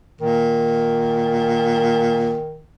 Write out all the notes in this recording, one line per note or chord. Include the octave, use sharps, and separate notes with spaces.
A#2 D#3